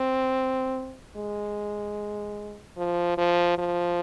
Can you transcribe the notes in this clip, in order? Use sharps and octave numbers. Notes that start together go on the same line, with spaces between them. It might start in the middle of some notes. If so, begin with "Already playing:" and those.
Already playing: C4
G#3
F3
F3
F3